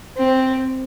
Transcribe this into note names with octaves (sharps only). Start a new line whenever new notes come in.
C4